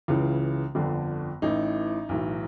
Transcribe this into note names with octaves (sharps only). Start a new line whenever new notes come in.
C#2 C#3 E3
G1 F2 D3
A1 A2 E3 D#4
B1 A2 E3